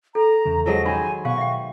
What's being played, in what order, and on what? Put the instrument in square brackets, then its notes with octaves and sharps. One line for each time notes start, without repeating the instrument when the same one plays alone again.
[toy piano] A4 [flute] A#5
[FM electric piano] E2 C#3
[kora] F3 F#3 G#3 [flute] A#6
[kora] D#3 C5 [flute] G#5 [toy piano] B5
[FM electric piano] B2 [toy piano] F5 [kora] F#5 [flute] C#6
[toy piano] E5 G5